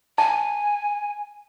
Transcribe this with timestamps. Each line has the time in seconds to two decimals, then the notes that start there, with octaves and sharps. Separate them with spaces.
0.18 G#5 A5